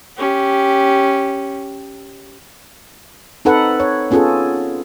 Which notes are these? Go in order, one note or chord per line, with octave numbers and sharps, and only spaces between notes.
C#4 G4
C4 D#4 A4 B4 F#5
C#5
B3 C#4 F4 G#4 A4